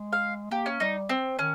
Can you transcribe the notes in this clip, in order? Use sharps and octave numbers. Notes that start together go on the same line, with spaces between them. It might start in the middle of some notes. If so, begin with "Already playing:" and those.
Already playing: G#3
F5
A#3 G4
C#4
G3 D#4
C4
D#3 C#4